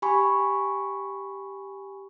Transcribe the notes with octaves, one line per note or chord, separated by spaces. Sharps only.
G4 G#5 B5 C#6